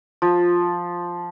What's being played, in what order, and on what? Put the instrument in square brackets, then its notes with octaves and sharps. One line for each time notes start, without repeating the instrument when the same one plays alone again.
[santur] F3